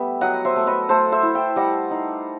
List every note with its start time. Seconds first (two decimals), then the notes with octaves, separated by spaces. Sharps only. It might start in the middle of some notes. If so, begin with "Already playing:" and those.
Already playing: G3 A3 B3 E5 G5
0.21 F#3 D#5 F#5
0.45 C5 E5
0.56 A3
0.67 B4 D#5
0.89 A3 A4 C5
1.12 C5 E5
1.23 E4
1.35 E5 G5
1.56 G3 D#5 F#5
1.91 D#4